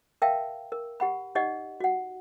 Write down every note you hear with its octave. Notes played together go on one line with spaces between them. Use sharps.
A#4 E5 F5 G5 A5
A#4
G4 F#5 B5
D#4 G4 D5 D#5 F#5
F#4 F#5